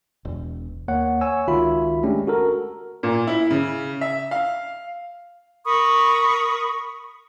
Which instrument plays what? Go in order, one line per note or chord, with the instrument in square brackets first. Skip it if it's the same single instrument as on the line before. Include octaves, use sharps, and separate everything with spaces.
[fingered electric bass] E1
[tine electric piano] D#2 A#3 C#5 F#5
C#5 G#5 E6
C#2 D#3 F4 F#4 E5 B5
G#3 A3 C#4 D4 G4
F#4 A4 A#4
[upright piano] A#2
E4
C#3
E5
F5
[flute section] A#4 B5 C#6 D#6